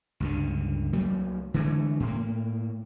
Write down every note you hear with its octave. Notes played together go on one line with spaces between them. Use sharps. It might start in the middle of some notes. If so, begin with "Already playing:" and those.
C#2 G2 D3
C2 F#3 A3 A#3
D3 E3 G#3 A3
A2 A#3